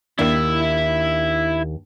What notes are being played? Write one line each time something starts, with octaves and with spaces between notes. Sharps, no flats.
D#2 D4 E4 E5